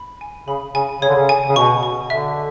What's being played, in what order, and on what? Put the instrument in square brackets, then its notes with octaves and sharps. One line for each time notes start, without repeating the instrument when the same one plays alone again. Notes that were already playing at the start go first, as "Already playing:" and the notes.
Already playing: [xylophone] B5
G#5
[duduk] C#3 [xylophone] B5
[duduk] C#3 [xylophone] G#5
[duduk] C#3 [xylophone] C#5
[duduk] D3
C#3
[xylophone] G#5
[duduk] C#3
[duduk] B2 [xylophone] C#6
[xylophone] C#6
[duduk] D3 [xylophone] E5